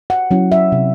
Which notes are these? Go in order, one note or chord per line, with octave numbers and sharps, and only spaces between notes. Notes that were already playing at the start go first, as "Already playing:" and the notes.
F#5
F#3 C#4 E4
E5
C3